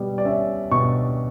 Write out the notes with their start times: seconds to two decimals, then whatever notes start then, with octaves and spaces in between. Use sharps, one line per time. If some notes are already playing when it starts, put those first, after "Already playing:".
Already playing: B2 G3
0.18 D5
0.25 C#4 E5
0.71 B2 C#6